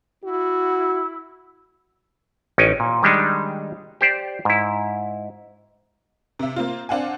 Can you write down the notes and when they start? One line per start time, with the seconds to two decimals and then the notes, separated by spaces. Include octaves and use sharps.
0.24 E4 F#4
2.58 A1 C#4 D#4 G5 G#5
2.80 A#2
3.03 D#3 G3 G#3 D4 D#4
4.01 G4 C5 D5
4.45 G#2 E4
6.39 C3 E5
6.56 A#3 C4 F4
6.89 C4 D4 F5 F#5 G#5